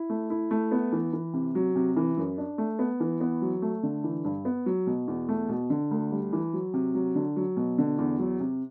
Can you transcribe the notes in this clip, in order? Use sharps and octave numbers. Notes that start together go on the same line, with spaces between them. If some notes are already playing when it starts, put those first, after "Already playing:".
Already playing: E4
A3
E4
A3
B3
E3
E3
C3
F#3
C3
E3
F#2
D4
A3
B3
E3
B3
F#3
A3
D3
E3
G2
B3
F#3
B2
E2
A3
B2
D3
D2
G3
E3
F#3
C3
F#3
D3
F#3
B2
D3
E2
F#3
C3